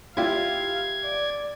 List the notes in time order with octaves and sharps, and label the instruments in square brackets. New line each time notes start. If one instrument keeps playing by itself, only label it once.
[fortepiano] E4 F4 G4 [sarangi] F5 [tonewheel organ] G#6
[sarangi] D5